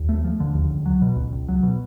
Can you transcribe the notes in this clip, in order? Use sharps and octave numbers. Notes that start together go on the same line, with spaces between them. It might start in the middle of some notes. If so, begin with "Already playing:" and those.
Already playing: D#2
A3
F3
D3
D#2
C#2
F#3
B2
C#2
C#2
F#3
B2